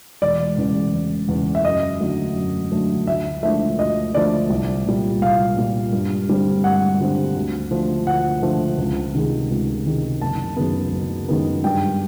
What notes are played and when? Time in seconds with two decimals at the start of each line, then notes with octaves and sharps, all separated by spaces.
0.22 E1 D5
0.58 E2 C#3
0.93 E1
1.28 E2
1.34 C#3
1.55 E5
1.65 F#2 D#5
2.00 D3 F#3 A3
2.36 F#2
2.72 D3 F#3 A3
3.07 D2 E5
3.43 D3 F3 A3 E5
3.79 D2 D#5
4.14 D3 F3 A3 D5
4.50 C2
4.86 A#2 G3
5.21 C2 F5
5.57 A#2 G3
5.93 G2
6.28 D3 G3 C4
6.64 G2 F#5
7.00 D3 G3 C4
7.36 D2
7.71 D3 F3 A3
8.07 D2 F#5
8.42 D3 F3 A3
8.78 C#2
9.15 C3 D#3 G#3
9.50 C#2
9.86 C3 D#3 G#3
10.22 F#1 A5
10.56 F#2 D#3 G#3 B3
10.92 F#1
11.28 F#2 D#3 G#3 B3
11.64 G2 G5